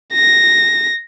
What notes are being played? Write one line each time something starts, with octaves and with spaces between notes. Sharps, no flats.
A#6